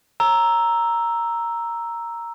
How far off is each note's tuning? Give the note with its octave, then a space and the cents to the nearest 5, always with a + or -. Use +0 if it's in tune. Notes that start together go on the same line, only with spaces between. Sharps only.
A#5 +0 E6 +0